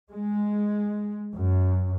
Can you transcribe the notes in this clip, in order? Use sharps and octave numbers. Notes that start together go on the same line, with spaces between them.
G#3
F#2